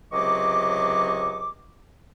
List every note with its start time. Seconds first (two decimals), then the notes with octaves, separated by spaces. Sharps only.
0.13 C#2 C3 F#3 D#5 C#6 D6